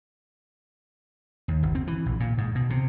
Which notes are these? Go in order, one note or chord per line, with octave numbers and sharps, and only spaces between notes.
D#2
G1
C4
E3
A#1
A#2
G#2
B2
C3